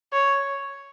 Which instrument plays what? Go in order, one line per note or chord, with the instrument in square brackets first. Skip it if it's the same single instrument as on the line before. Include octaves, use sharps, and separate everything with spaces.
[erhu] C#5